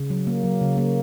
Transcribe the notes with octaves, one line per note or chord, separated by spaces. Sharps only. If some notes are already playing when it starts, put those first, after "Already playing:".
Already playing: C#3
F#3
A#3
F#3
C#3
A#3